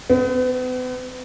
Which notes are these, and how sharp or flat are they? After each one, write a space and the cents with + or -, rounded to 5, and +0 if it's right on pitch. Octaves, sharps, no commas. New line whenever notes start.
B3 +40